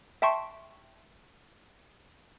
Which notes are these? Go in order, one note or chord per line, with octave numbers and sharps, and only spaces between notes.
E5 G5 A5 C6 C#6